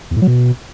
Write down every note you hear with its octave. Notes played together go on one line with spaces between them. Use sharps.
E2
A2
F#3
B2